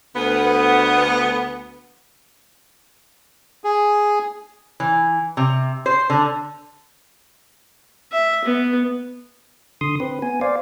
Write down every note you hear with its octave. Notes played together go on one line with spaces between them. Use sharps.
D2 B3
G#4
E3
C3
C5
D3
E5
B3
D3 C6 D#6
C4 B4
B3 G#5
C5 D5 F5